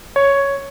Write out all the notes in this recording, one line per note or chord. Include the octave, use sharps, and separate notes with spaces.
C#5